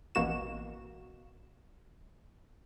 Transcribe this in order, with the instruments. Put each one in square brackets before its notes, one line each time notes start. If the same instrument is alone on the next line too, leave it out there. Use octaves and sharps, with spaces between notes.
[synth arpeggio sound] A1 B2 A#3 F#4 E7